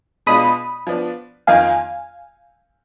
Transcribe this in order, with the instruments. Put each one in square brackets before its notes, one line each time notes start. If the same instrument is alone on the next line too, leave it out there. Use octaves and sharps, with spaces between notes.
[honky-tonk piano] B2 G#3 D4 F4 [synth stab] B5 D#6
[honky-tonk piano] F3 B3 D4
[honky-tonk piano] F2 D#3 A#3 F4 [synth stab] F5 G#5